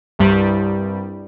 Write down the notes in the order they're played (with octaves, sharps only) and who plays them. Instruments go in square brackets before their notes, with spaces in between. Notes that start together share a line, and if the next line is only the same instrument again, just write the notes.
[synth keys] C2 G2 G3